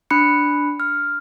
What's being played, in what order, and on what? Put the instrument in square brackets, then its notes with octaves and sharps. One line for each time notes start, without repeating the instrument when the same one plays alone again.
[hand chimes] D4 B5 F#6 C#7
F6